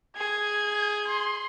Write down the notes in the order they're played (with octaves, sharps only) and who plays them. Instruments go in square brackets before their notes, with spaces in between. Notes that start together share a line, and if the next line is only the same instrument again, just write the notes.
[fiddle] G#4 [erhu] G#6
[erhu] C6